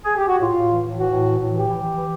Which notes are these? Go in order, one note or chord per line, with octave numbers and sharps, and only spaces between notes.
G#4
G4
F#4
A2 F4
A2
E3
A2
E3 F#4
A2
E3
A2
E3 G4
E3
E3
E3